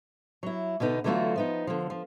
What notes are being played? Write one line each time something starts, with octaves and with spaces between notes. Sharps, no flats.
F#3 E4
B2 D3 B3 D#4
D3 E3 F#3 A3 F4 F#4
F3 B3 D#4
D3 F3
F3